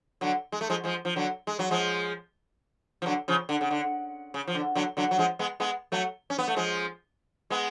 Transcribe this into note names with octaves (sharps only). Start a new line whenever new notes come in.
D3 F#3
G#3
A3
F3 G#3
F3 G#3
F3
D3 F#3
G#3
F#3
F3 G#3
F3
D3 F#3
C#3 F3
D3
C#3
D3
C#3
F3
D3
D3 F#3
D3 F#3
F#3
F3 G#3
G#3 B3
G#3 B3
F#3 A3
C#4
B3
A3
F3 G#3
G#3 B3